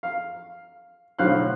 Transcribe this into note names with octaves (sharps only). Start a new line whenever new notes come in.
F5
B1 A2 D3 C5 F5 F#6